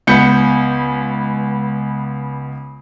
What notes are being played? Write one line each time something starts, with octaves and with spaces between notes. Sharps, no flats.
C#2 B3 G6 C#7